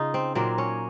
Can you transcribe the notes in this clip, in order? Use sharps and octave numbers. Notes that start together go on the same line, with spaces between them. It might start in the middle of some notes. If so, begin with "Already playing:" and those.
Already playing: C#3 D#4 F4
C4
A#2 F#3 A#3 C4
C#4